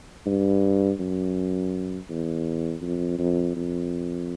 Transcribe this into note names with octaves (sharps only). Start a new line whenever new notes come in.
G2
F#2
E2
F2
F2
F2